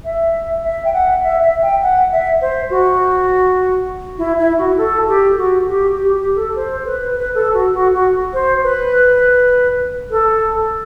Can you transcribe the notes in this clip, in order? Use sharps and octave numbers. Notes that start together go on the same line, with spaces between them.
E5
E5
G5
F#5
E5
E5
G5
F#5
E5
C5
F#4
E4
E4
F#4
A4
G4
F#4
G4
G4
G4
A4
C5
B4
B4
A4
F#4
F#4
F#4
C5
B4
A4